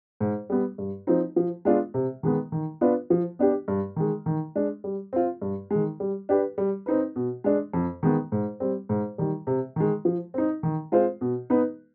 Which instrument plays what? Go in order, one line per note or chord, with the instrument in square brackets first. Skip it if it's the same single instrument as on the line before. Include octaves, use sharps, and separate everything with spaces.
[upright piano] G#2
G3 B3
G2
F3 C4 D#4
F3
G#3 B3 D4 F4
C3
D#3 G#3 B3
D#3
B3 D4 F4 B4
F3
B3 D4 G4
G2
D#3 G#3
D#3
G#3 D4
G3
C4 F4
G2
D#3 G#3
G3
D4 G4 B4
G3
C4 D#4 B4
B2
G#3 D4
F2
D#3 G#3 B3
G#2
G3 C4
G#2
D#3 G3
C3
D#3 G#3
F3
C4 D#4
D#3
G#3 C4 F4 C5
B2
B3 D#4 B4